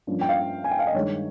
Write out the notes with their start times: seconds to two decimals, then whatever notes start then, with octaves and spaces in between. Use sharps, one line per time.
0.07 G2 F3 A#3 C#4
0.21 G5
0.29 F5
0.64 G#5
0.71 G5
0.79 F5
0.87 D#5
0.94 G2 D#3 G#3 C#5